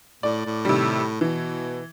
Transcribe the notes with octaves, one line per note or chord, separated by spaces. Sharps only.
A2 D5
A2
C3 D#3 G3
B2 E3